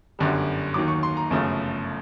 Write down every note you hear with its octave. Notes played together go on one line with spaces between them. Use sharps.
G1 F#2 D3 G3
D#2 D#3 F#3 D6
C#6
C6
A#5
G1 F#2 C#3 F3 A3